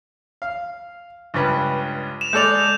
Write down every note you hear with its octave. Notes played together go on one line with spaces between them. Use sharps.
F5
C#2 G2 B4
E7 F7
G#3 A4 D5 G6 F7